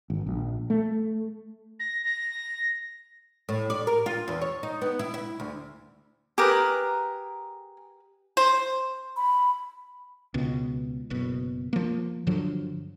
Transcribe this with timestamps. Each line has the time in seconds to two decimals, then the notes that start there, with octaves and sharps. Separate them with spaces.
0.10 G#1
0.26 A#1
0.70 A3
1.80 A#6
2.05 A#6
3.49 A2
3.70 D5
3.87 A#4
4.06 F4
4.28 E2
4.41 C#5
4.63 D#4
4.81 B3
4.99 E4
5.14 E4
5.40 D2
6.38 G4 G#4 A#4 B4 A#5
8.37 C5
9.17 B5
10.34 C#2 B2
11.10 F#1 B2
11.73 F3 A#3
12.27 G2 D3 F3 F#3